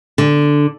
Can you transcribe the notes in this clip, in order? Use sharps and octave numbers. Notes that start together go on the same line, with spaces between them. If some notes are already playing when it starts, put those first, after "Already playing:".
D3